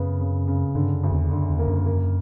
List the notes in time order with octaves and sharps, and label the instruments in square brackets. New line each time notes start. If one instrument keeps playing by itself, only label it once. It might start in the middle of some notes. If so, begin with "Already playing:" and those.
Already playing: [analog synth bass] F#2 [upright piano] C#3 B3
[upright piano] C#3
C#3
[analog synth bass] G2 [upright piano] D3
[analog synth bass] F#2
[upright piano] D2
[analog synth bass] E2
[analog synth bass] F#2 [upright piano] D3
[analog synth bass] E2
[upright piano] A#3
[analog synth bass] F#2
[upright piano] A#3